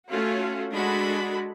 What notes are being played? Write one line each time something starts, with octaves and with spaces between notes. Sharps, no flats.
A3 C#4 F4 F#4
G#3 D4 F#4 A4 B5